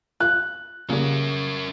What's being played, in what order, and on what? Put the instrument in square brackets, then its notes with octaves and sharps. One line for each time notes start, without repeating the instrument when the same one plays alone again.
[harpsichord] F4 F5 [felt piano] F#6
[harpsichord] A#2 G3 [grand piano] C#3 [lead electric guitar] C#4 A#4